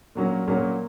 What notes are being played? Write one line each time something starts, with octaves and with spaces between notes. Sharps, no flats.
A#2 F#3 A#3 C#4
A#2 F#3 A#3 C#4